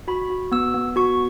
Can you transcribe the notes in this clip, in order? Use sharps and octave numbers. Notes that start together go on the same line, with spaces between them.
F#4 B5
F#4
B3 E6
B3
F#4 C#6